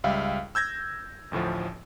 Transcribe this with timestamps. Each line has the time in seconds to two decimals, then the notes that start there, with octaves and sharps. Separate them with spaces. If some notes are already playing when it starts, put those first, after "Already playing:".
0.04 C#2 G3 E5 F5
0.55 E6 G6 G#6 A#6
1.32 A1 D2 A2 F3